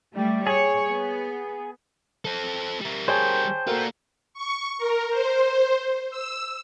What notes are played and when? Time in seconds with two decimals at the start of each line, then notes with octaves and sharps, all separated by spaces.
0.14 G3 A3
0.47 G#4 C#5
0.87 B3
2.25 C4 A4
2.81 G3 A#4
3.08 G#4 C5 C#5 G5 A5
3.67 A#3 F4 F#4 A4 A#4
4.34 C#6
4.78 A#4
5.10 C5
6.10 E6